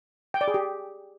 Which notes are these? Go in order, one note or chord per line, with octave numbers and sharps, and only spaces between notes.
G5
D5
G#4
G4